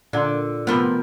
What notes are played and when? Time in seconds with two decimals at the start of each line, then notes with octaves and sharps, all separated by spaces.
0.13 A#2 D3 D5 F#5 C6
0.67 C3 F3 B3 A#4 C5 B5